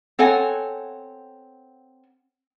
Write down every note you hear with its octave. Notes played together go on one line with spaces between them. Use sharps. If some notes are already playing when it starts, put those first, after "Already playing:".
C4 A4 C#5 F#5 G#5